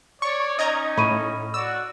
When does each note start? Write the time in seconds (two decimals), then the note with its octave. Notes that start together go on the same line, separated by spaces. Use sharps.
0.22 C#5 D5 C#6
0.59 C#4 D#4 D#5 A#5 G#6
0.97 A2 B5 C#6 D#7
1.54 F#4 D5 E6